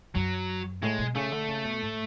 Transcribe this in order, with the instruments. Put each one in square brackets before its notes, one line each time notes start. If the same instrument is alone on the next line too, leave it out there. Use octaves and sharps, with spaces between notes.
[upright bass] F#2 [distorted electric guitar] F#3
[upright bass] A2 [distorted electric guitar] G#3
[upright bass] B2
[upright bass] C#3 [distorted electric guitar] A3
[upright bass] D3
C#3
B2
A2